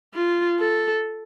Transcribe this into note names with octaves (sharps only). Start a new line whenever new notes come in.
F4
A4